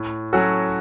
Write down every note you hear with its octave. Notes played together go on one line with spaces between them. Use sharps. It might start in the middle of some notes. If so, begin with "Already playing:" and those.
Already playing: A2
F#3 C#4 F#4 A4